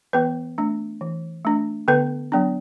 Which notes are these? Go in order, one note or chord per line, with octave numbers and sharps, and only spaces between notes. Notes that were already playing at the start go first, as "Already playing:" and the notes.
E3 B3 B4
A3 D4
E3
A3 D4
D3 B3 B4
F#3 B3 D4